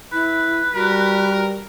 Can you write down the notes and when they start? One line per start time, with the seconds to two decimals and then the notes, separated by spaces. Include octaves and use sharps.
0.12 E4 B4
0.74 G3 F#4 A#4